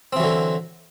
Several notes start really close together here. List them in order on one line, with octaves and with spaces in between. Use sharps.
C4 E3 F#3 D3